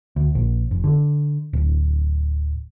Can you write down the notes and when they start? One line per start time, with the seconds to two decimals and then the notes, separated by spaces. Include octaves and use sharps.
0.16 D2
0.35 A#1
0.71 F1
0.84 D3
1.53 D1